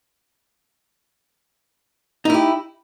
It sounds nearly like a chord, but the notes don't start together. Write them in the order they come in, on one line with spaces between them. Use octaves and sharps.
D#4 E4 G4